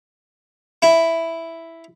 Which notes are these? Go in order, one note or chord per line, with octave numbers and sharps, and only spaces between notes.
E4